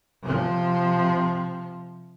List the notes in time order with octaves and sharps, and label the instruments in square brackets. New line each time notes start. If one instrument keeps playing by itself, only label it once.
[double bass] C3 F3